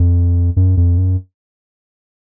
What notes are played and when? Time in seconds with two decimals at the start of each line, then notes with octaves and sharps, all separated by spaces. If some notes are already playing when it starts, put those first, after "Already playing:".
Already playing: F2
0.56 F#2
0.77 F2
0.98 F#2